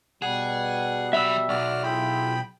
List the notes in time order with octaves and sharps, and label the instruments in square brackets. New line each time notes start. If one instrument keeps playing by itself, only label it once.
[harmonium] B2 G3 [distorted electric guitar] G#4 [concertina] F#5
[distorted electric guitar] F#3 B5 [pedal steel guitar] E5 E6
[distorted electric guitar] B1 [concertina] F#4 D5 F6
[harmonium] E4 F4 G#4 [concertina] G5 B5